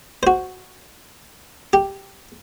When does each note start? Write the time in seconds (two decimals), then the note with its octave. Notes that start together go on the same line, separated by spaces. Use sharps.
0.23 F#4 C5
1.73 G4